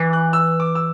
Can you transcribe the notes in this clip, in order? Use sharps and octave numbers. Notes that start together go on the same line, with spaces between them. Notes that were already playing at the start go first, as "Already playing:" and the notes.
Already playing: E3 D6
F#6
E6
D6
E6